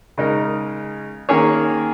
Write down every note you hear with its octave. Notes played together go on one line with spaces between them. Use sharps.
C#3 G#3 D#4 A#4
D#3 A#3 C#4 G#4 C#5